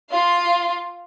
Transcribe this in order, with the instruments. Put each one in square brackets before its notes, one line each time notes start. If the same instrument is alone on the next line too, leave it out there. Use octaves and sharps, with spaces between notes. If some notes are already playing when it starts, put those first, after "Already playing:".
[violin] F4 F5